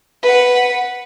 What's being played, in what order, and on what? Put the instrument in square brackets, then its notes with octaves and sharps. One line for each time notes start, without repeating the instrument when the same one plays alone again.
[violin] B4 F#5